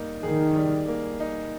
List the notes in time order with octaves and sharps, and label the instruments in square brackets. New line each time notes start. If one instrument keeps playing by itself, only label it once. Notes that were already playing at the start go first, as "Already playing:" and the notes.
Already playing: [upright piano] G3 A#3 D#4
[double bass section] D#3 [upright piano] G#4
[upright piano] G3
A#3
D#4